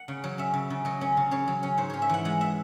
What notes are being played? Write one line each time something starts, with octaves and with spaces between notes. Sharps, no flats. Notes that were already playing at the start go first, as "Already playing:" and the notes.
Already playing: F#5
C#3
F#3
C#4 E5
C#3
C#3
F#3 D#5
C#4
C#3
C#3 C#5
F#3
C#4
G#2 C5
C#4 C#5
E5
E3 F#5
G#3 F#5
E5